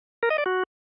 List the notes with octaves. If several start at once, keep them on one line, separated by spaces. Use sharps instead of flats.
A#4
D#5
D5
F#4